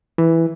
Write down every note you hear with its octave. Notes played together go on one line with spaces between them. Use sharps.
E3